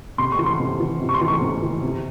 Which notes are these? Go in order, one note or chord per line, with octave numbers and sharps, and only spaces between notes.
C3 C6
C#6
E3
C6
C3
E3
C3
C#6
C6
E3
C#6
C3
E3
C3